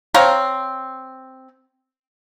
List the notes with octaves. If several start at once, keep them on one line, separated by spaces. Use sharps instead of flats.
C4 C#5 F5 A#5